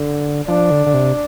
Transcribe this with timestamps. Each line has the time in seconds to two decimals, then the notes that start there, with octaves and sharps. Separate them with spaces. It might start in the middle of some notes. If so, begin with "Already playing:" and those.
Already playing: D3
0.48 F3 D4
0.71 D3
0.86 D3
0.94 C3